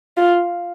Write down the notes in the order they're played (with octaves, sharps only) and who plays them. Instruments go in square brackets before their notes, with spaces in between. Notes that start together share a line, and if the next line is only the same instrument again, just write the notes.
[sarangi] F4